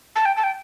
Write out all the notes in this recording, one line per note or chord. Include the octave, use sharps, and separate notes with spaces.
A5
G5
A5
G5